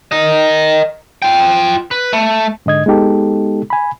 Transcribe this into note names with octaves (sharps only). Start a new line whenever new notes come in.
A#4 D#5
F4 G5
B4
A3
G#2 D3 D#5 G#6
G#3 B3 D#4 G4 A4
G#5 B5